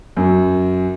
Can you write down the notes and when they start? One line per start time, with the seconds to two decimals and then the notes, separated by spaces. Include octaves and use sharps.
0.17 F#2